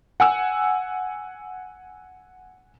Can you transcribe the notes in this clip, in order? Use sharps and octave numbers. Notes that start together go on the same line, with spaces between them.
F#5 G#5 E6